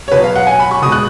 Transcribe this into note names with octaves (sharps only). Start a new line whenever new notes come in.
C#5
B2 F#3 B4
F5
F#5
G#5
B5
C#6
B2 G#3 D#6
F#6